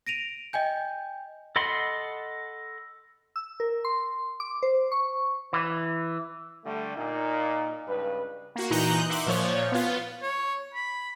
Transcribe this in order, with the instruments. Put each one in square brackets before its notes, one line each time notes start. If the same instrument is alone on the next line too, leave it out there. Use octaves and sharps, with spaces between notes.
[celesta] A#6 D7 D#7 F7
D#5 G5 G#5 G6
[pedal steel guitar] A4 D#5 F#5 B5 C6
[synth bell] E6
A#4
C6
D6
C5
C#6
[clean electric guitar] E3
[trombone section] D3 G3 A3
A#2 D#4
C#2 G2 B4
[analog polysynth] A#3 F#4
A#2 E3 D#4 A#5 F#6 G6
E5 F#5 C6 D6
A#2 F3 C#5
B3 F4
[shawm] C#5
B5